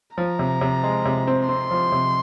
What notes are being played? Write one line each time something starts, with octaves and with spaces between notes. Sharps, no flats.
F3 A#5
C3
C3
G#3
C3
C4
C4 C6
F3
C3